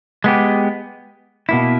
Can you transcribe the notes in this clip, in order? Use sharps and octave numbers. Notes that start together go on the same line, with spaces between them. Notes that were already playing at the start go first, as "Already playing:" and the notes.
G#3 B3 G4
B2 A#3 E4